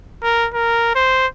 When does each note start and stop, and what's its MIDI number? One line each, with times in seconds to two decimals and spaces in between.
0.23 0.48 70
0.54 0.94 70
0.95 1.27 72